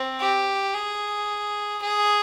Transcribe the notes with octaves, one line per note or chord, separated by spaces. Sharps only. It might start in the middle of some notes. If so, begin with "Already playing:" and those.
Already playing: C4
G4
G#4
G#4